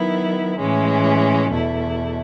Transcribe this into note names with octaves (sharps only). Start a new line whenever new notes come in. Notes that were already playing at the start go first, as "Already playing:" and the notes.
Already playing: D#3 F#3 B3 E4
A2 E3 G#3 C#4
E2 B2 A3 E4